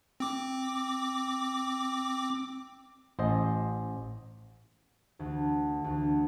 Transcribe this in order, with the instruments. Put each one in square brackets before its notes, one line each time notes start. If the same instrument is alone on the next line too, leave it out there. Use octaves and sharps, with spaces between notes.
[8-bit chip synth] C4 D6
[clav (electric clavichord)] A1 C5 D#5
[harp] D2
D2